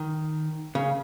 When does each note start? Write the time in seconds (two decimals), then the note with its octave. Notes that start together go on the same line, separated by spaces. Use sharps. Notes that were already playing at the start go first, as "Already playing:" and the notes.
Already playing: D#3
0.75 C#3